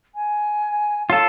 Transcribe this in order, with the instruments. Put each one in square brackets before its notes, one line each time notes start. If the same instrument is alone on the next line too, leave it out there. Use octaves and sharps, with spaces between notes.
[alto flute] G#5
[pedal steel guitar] F4 A4 [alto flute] C#5